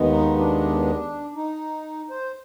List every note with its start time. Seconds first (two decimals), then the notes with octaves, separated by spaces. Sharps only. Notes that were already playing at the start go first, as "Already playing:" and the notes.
Already playing: D#2 D#3 G#3 B3
0.12 D#4
0.38 D4
1.35 D#4
2.10 C5